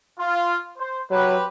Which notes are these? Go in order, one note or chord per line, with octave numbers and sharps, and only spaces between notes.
F4
C5
F#3 C4 G4 B4